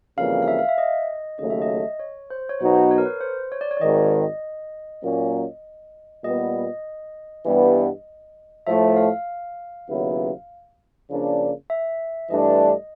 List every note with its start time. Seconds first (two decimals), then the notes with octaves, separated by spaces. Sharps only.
0.17 F2 C#3 E3 G3 A#3 F5
0.42 F5
0.48 E5
0.59 F5
0.69 E5
0.78 D#5
1.39 D#2 C#3 F#3 A3 D#5
1.50 E5
1.62 D#5
2.00 C#5
2.30 C5
2.49 C#5
2.60 B2 F#3 B3 D#4 F#4 C5
2.75 C#5
2.91 C#5
2.98 A#4
3.05 B4
3.21 C5
3.52 C#5
3.61 D5
3.71 C#5
3.77 D5
3.81 G#1 G#2 D#3 D#5
5.03 A#2 F#3 A#3 C#4
6.24 A#2 G3 B3 D#5
7.45 G2 E3 G3 B3
8.67 A2 F3 A3 E5
8.97 F5
9.88 D#2 C#3 F#3 B3 E4
11.09 C#3 F3 A#3 D4
11.70 E5
12.30 G2 E3 A3 D4 D#5